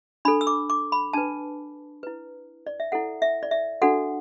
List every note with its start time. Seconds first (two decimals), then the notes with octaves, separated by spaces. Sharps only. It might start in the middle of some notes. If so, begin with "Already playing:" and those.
0.25 D4 A4 B5
0.41 E6
0.47 D6
0.70 D6
0.92 B5
1.13 D4 B4 A5
2.03 E4 B4
2.67 D5
2.80 E5
2.92 E4 A4 F#5
3.22 E5
3.43 D5
3.51 E5
3.82 D4 F#4 A4 F#5